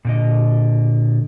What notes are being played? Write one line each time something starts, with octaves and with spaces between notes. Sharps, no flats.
A#2 D3 D#5